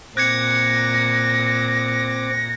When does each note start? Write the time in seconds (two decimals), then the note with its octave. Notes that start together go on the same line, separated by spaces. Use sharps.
0.17 A#2 C4 D6 F#6 G#6 A#6 C#7